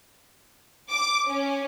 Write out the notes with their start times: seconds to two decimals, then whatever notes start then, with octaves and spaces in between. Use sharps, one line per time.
0.90 D6
1.28 C#4